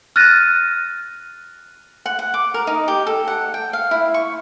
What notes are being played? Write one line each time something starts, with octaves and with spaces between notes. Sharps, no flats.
F6 F#6 A6 A#6 D#7
F#5
F#5
D6
A#4
D#4
G4
A4
F#5
G5
F5
E4
C#6